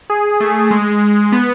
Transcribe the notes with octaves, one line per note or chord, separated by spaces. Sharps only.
G#4
A3
G#3
G#3
B3